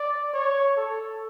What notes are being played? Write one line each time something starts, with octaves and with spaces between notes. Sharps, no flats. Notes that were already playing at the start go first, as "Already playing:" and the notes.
Already playing: D5
C#5
A4